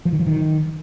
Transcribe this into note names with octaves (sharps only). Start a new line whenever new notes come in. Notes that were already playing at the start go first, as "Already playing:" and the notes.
F3
D#3
F3
D#3